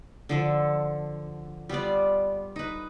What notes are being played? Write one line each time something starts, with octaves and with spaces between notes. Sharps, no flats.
D3 F3 A4
G3 B3 F4 D5
D#4 B4